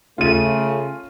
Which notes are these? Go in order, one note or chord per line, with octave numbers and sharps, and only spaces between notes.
C#3 A3 F4 D#7